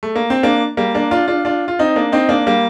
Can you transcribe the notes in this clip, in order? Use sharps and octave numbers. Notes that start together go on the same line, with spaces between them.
A3
A#3
C4
A#3 D4
G3 A#3
A#3 D4
D4 F4
D4 F4
D4 F4
F4
C4 D#4
A#3 D4
C4 D#4
A#3 D4
G3 A#3